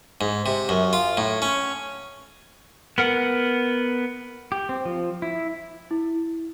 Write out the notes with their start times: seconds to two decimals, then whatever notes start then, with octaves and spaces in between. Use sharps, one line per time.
0.21 G#2
0.46 C3
0.69 F#2
0.93 F4
1.17 A2
1.42 C#4
2.98 B3 A#4 F#5
4.52 G4
4.69 C4
4.85 F3
5.22 E4
5.91 E4